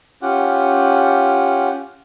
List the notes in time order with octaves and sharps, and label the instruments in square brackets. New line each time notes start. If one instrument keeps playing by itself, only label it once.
[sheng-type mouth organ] C#4 F4 G4 F#5